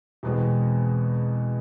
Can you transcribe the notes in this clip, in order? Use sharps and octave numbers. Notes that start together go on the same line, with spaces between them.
E2 B2 G#3 C4